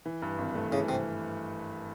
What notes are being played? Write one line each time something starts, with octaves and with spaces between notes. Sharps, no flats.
E3
G2
G#1
A3
C#3 E3
C3